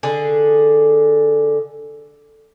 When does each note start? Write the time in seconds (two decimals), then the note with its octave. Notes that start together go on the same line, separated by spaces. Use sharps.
0.03 D3 G#4